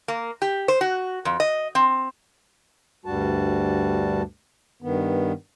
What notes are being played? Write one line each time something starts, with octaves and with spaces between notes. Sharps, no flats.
A#3
G4
C5
F#4
F2
D#5
C4
D2 G2 G3 F#4 A5
G2 D#3 B3